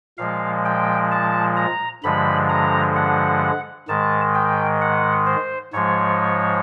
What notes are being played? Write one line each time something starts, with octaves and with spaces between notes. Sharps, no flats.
A#2 F3 G#3 F5
G5
A5
A#5
G2 D3 F3 G#3 B5
A#5
F#5
G#2 D#3 G#3 A5
G5
F#5
C5
G#2 F3 G#3 C#5